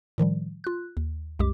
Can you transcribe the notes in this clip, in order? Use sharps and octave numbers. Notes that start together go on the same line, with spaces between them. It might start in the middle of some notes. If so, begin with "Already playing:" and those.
A2 D#3 F3 G3
F4 F#6
D#2
C2 F#2 G#3 G4 D6